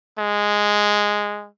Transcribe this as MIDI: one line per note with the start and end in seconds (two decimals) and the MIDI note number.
0.18 1.47 56